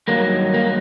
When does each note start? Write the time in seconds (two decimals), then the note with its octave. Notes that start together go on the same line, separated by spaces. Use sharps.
0.08 G2 D#3 F#3 A#3
0.54 A#3